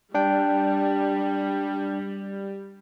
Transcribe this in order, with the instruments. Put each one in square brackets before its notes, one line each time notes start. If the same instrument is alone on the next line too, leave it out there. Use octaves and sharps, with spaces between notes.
[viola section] G3 [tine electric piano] D4 G5